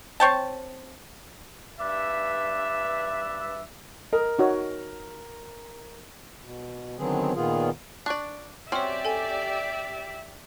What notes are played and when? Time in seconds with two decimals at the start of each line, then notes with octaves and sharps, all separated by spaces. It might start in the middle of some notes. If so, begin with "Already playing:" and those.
0.20 C4 C#5 G5 A5
1.80 G2 B4 D5 E5
4.13 A#4 D#5
4.39 D#4 F#4 C#5
6.44 B2
6.98 D3 D#3 F#3 B3 C4 G#4
7.35 A#2 D#3 B3 F4 G#4
8.06 D4 D5 C#6 F#6
8.72 C4 C#4 F#4 G4 C#5 D5 E5 F6
9.05 A4 G#5